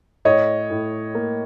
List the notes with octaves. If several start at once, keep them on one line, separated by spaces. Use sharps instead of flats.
A2 C#5 D#5
A2
A#3